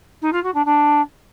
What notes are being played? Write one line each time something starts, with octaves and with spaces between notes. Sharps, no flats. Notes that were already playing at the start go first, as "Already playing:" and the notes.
D#4
F4
F#4
D4
D4